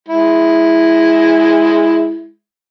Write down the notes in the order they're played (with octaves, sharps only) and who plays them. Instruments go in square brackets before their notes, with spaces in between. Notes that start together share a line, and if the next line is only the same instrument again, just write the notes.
[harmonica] G#3 E4